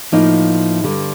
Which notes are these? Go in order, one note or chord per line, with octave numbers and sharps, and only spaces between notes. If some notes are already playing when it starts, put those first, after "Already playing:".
A2 F3 A#3 D#4
G2 D3 G3